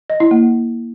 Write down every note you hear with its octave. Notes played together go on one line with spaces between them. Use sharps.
D#5
E4
A#3